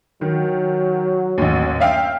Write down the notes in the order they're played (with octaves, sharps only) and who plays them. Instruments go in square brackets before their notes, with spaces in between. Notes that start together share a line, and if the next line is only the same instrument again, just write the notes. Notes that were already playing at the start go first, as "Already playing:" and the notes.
[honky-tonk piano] D#3 [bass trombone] F#3
[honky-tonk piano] A1 D#2
E5 F5 G5